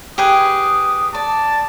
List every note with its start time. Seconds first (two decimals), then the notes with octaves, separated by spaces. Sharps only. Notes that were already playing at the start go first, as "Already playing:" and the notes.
0.18 G4 G#4 B4 D#6
1.15 D5 A5